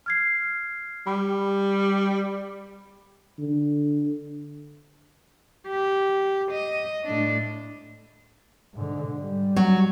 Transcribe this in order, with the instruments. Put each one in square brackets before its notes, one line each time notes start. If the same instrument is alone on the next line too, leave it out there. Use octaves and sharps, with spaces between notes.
[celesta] F6 G#6 C7
[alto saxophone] G3 [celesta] B5
[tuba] D3
[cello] G4
D#5
A2 D4
[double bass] G#2 D3
G3
[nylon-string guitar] F#3 F#4